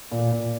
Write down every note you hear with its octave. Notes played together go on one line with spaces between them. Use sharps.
A#2
A#2